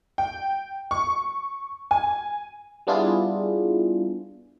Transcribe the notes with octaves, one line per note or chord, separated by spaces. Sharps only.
G5
C#6
G#5
G3 B3 D4 E4 F4 G#4